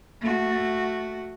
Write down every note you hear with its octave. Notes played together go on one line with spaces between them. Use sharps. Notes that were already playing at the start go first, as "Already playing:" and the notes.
A3 F#4